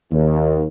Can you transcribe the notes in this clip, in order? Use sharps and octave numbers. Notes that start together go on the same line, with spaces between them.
D#2